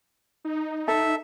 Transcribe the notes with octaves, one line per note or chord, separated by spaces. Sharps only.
D#4
A4 E5